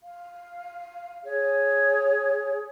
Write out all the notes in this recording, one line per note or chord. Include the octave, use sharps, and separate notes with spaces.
F5
G#4 C#5